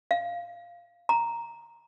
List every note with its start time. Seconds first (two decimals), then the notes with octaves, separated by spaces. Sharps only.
0.11 F5
1.09 A#5